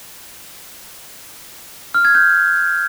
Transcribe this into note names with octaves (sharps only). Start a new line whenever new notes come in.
F6
G#6
G6